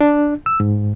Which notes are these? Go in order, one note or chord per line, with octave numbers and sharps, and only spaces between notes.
D4
E6
G#2